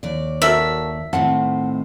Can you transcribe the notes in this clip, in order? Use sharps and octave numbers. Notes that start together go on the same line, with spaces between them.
D#2 D5
F#4 A4 A#4 E5
A2 D#3 C4 F#5 A5